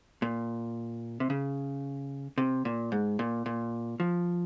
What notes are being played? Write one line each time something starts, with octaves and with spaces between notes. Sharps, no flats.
A#2
C3
C#3
C3
A#2
G#2
A#2
A#2
F3